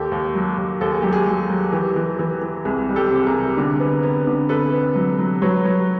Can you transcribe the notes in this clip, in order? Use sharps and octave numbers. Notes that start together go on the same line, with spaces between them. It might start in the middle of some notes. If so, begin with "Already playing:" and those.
Already playing: D#2 G4 A4
D#2
F#3
D#2
D#2 A4
G#4
F#3 G4
G#4
F#3
F#3
E3 G4
E3
E3
E3
C2 G#4
G3
G4 A4
C3
G#4 A#4
C3
D3
B3
B3
D3
B3 A4 B4
B3
F#3
F#3
F#3 B4 C#5
F#3